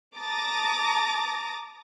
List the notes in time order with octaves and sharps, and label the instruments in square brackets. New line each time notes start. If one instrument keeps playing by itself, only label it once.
[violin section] A5 A#5 D6 D#6 A6 A#6